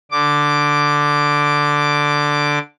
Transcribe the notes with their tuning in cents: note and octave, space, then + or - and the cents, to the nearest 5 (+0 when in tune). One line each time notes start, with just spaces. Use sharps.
D3 +0 D6 +0